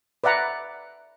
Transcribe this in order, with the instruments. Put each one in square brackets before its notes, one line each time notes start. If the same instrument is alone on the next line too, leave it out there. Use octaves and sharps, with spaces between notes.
[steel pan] B4 D5 E5 F#5 A#5